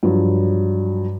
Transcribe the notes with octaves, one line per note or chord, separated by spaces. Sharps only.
G2 F3 F#3